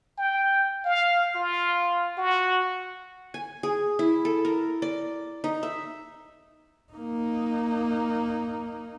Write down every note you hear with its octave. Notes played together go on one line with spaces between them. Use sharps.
G5
F5
F4
F#4
G#5
G#4
E4
A4
A#4
D5
D#4
E5
A#3 D#4